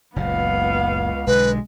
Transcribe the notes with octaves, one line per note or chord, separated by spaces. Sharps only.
F#1 C#2 A#2 B3 F5
B1 D3 G#3 B4